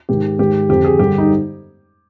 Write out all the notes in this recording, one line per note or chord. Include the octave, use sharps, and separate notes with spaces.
G#2 D#3 G4
G#2 D#3 G4
F2 D3 G4
G#4
G2 D3 G4
D#4